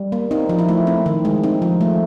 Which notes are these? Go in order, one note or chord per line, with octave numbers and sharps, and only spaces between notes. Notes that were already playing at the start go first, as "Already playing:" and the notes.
Already playing: G3
A#3
C4 D#4
F3
E4
A3
C4
D#3
G#3
C4 D#4
F3
A3